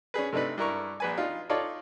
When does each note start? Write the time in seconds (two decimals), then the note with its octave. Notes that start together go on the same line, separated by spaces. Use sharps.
0.14 C#4 D4 G#4 B4
0.32 C3 A3 D4 D#4 B4
0.57 G2 E4 A#4 A#5 C#6
1.00 A#1 B4 G#5
1.18 D4 D#4 F4
1.49 D#4 F4 A4 C#5 D5